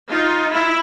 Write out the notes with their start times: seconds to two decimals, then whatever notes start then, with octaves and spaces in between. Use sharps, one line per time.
0.10 D#4 F4
0.52 E4